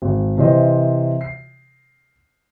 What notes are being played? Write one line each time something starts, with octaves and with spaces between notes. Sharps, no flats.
G#1
C3 E3 C5 D#5
C7